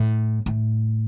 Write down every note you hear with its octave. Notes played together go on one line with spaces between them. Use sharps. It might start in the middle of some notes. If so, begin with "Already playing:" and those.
Already playing: A2
A2